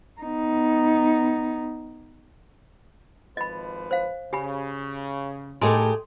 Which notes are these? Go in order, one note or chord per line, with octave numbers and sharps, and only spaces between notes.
B3 D#4
G#1 F3 B4 D#5 B5
C5 F5
C#3 G4 G#5 B5
A2 A3 D#4 G4 G#4 A#4 C6